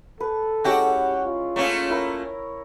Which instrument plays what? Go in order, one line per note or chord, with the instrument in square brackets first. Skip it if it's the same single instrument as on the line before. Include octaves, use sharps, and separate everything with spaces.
[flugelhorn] A4 [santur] B4
[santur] G#3 C#4 E4 [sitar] F#4 G4
[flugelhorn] F4
[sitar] A3 A#3 C#4 [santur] C#5
[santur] E4 A#4 B5